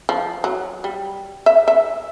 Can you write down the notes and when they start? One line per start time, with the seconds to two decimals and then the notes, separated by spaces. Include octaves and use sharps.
0.09 F3
0.44 F#3
0.84 G3
1.46 E5
1.68 E5